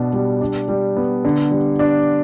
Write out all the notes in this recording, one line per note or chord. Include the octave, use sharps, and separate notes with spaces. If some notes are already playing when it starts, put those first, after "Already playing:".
Already playing: B2 B3 D4
G3
D4
G3
B3
D3
G3
D4